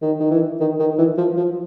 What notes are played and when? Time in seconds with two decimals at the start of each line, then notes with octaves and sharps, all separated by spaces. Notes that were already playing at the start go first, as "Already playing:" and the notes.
0.02 D#3
0.20 D#3
0.31 E3
0.60 D#3
0.79 D#3
0.98 E3
1.18 F3
1.37 F3